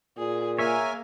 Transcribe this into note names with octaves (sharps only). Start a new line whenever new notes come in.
A#2 G#4
A#3 A#4 C#5 E5 G#5